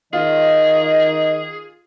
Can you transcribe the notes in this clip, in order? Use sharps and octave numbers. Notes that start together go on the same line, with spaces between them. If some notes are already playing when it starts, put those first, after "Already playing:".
D#3 F4 G#4 D#5